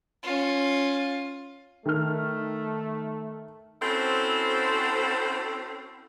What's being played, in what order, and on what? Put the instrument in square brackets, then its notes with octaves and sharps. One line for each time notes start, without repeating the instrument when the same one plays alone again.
[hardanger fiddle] C#4 F4
[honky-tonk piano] D#3 F6 [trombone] A3
[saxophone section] C4 C#4 E4 F#4 A4 C5